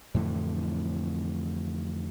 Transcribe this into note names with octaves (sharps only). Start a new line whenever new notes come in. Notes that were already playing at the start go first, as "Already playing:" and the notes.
F2 A2 D3 E3